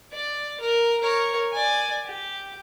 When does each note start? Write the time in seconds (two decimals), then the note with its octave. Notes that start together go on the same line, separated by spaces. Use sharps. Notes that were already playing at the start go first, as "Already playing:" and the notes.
0.11 D5
0.60 A#4
1.01 A#4 C#5
1.53 D5 G#5
2.05 G4